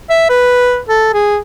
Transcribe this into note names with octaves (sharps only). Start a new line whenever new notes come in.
E5
B4
A4
G#4